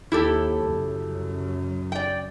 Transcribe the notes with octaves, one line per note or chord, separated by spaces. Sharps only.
D#2 E4 G4 A4
F#2 C#3
D5 G5